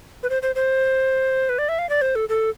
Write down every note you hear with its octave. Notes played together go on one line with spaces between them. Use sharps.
B4
C5
C5
C5
B4
D5
E5
F5
D5
C5
A4
A4